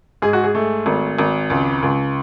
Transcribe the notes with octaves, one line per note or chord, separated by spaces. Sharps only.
G#2 G#4
F#4
G#4
A3
G#1
G#1
C#2
C#2